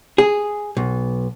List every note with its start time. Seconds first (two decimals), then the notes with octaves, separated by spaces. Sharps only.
0.18 G#4
0.77 B1